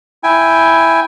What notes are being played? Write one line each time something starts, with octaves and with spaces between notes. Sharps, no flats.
E4 G5 G#5